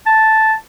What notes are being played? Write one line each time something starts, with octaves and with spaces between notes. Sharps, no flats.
A5